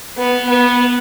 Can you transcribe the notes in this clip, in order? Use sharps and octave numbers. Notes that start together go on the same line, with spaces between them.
B3
B3